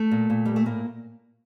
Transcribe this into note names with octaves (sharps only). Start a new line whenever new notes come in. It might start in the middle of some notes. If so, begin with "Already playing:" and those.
Already playing: A3
A#2
A#2
A#2 G3
A3
A2 A#3